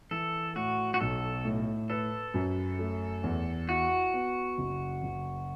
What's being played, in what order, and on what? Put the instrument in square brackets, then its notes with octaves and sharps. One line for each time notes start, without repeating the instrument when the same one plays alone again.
[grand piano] E3 [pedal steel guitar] A4
[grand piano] A2 [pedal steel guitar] F#4
[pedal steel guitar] F#4
[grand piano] B1 [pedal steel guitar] A4
[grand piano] A2
[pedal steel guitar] A4 [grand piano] B4
[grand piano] F#2
A3
E2
[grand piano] E4 [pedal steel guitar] F#4
[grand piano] B3
F#1
F#1